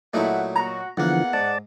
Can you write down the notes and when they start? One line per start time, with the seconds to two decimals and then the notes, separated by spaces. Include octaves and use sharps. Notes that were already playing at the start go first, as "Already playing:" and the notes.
0.14 A#2 F#3 A3 D#4 E4 F#5
0.56 F#4 A#5
0.97 E2 D3 E3 F3 A#3 F#5
1.33 G#2 D5 A5